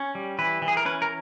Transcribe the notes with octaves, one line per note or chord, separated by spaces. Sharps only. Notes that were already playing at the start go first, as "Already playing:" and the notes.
Already playing: C#4
G3
E3 B4
E3
G#4
A#4
C#4 B4
A#4